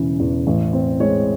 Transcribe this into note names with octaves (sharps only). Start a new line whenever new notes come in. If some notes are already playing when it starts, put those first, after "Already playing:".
Already playing: E1 C#3 E3
E2
A1
C4
G#3 C#5